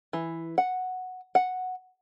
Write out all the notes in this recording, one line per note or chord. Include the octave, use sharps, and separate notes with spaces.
E3
F#5
F#5